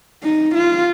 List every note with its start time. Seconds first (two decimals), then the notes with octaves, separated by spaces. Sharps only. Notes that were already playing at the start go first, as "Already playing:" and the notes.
0.23 D#4
0.55 F4